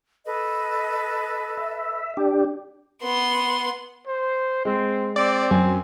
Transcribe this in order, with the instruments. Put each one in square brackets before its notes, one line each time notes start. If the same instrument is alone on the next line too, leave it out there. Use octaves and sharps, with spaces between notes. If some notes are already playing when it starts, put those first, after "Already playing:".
[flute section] A4 B4 D#5
[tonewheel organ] E5
D4 G4
[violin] B3 C6
[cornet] C5
[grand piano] G#3 [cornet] C4
[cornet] C4 [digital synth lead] D5
[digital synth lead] F#2 [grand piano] G#5